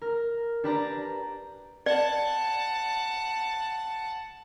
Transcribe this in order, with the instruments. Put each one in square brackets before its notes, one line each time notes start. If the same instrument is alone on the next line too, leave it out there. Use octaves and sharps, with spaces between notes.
[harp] A#4
D4 G4 B4 D5 A#5
[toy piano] D5 [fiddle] F#5 A5